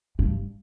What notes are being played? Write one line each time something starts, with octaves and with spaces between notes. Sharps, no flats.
G2